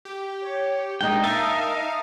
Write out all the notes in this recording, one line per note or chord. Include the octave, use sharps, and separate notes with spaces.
G4
C#5
A#2 G#3 D4 D#4 G5
A#4 E5 F5 A5
D#6